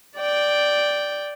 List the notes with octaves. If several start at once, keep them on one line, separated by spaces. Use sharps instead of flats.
D5 G5